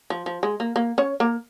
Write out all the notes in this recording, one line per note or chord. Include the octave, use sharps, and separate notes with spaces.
F3
F3
G#3
A#3
A#3
C#4 C#5
A#3 A#4